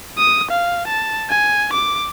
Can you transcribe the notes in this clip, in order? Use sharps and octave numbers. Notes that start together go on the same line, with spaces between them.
D#6
F5
A5
G#5
D6